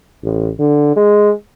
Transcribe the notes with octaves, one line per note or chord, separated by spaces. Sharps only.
A1
D3
G#3